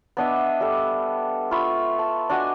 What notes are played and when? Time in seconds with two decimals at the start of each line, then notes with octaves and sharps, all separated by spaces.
0.17 B3 D4 D#5 E5
0.60 G3 A4
1.51 F4 E5 B5 C#6
1.99 A5
2.29 D4 F#4 D#5 G#5